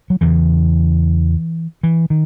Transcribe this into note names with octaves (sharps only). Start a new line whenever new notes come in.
F#3
E2 C#3 E3
E3
D#3